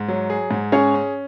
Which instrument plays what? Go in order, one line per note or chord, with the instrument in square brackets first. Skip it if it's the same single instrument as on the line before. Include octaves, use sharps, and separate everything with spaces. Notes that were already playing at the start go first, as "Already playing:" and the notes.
Already playing: [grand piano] G#2
F#3
G#4
G#2
[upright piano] C#4 C#5 [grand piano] G#4
[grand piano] C#4